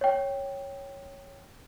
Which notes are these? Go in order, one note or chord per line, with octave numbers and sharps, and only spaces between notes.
C#5 G5